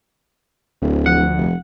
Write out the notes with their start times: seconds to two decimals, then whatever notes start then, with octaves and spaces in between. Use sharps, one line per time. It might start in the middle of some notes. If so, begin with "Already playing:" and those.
0.82 D1 D2
1.06 F3 F#5
1.37 F1